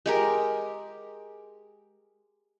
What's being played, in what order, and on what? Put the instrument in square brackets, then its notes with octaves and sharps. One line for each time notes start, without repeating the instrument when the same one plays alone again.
[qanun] G#3 G4 A#4